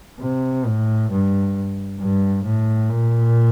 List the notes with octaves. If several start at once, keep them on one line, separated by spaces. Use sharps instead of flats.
C3
A2
G2
G2
A2
A#2